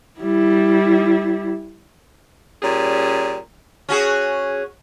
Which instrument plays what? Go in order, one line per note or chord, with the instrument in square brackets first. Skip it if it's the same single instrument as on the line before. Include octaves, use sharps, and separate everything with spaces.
[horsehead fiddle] G3 E4
[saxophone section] A#2 G3 C#4 G#4
[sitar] C#4 F#4 G#4